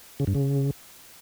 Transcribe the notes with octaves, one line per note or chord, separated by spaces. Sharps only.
C#3
G2
C#3